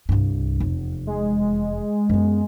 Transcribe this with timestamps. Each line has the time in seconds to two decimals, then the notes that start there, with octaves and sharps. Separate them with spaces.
0.09 C2 G2
0.60 F1 E2
1.07 G#3
2.09 F#2 B3